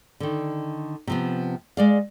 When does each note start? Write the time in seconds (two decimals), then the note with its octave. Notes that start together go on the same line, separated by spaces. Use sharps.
0.20 D3 D#3
1.07 C3 F3 B3
1.77 G#3 D5 F5